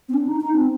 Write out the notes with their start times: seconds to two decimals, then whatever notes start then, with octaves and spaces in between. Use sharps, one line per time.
0.09 C4
0.14 D4
0.28 D#4
0.41 D#4
0.54 C4